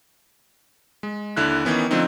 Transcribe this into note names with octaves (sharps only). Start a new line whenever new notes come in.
G#3
D#2 D3 E4 F#6
D#3 E3 B3 C#4
D3 F3 A3 C4 D#4